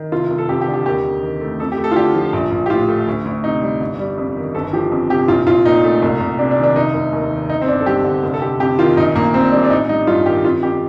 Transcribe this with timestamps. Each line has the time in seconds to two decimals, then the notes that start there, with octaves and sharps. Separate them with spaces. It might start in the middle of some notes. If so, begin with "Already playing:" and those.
Already playing: D#3
0.12 F1 F4
0.31 F1
0.38 A4
0.49 F2 G4
0.61 G4
0.68 D3
0.74 G4
0.86 D#2 G4
1.05 D#2
1.22 D#3
1.41 A3
1.60 F2 A4
1.72 G4
1.78 A3
1.84 A4
1.92 F4
1.96 D3 G4
2.14 F3
2.33 A#1
2.51 A#1
2.66 G4
2.70 A2 F4
2.88 A3
3.07 D2
3.25 D2
3.44 C3 D#4
3.62 G3
3.81 G1
3.99 G3
4.18 F2
4.36 D#3
4.55 G1 A4
4.73 F3 G4
4.92 F2
5.10 C3 G4
5.28 A#1 F4
5.47 A#1 F4
5.65 A#2 D#4
5.84 A3
6.03 C2
6.21 C2
6.39 C3 D4
6.51 D4
6.58 D#3
6.63 D4
6.76 F1 D#4
6.94 F1
7.13 D#2
7.31 D#3
7.49 G1 D#4
7.61 C4
7.68 G1 D4
7.81 A4
7.86 G2 G4
8.04 D3
8.24 F1
8.34 A4
8.42 F1 G4
8.60 F2 G4
8.79 D#3 F4
8.97 A#1 D#4
9.15 A#1 A#3
9.34 A#2 C4
9.52 G3 D4
9.64 D4
9.70 A1 D#4
9.89 G3 D#4
10.07 G2 F4
10.26 D#3 G4
10.44 F2 F4
10.63 F2 G4